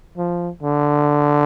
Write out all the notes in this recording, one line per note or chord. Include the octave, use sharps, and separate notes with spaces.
F3
D3